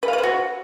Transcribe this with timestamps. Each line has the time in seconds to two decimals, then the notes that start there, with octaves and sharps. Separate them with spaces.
0.03 B4
0.08 F5
0.13 B4
0.18 C5
0.23 F#4